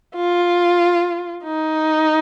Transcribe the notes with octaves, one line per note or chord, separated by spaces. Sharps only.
F4
D#4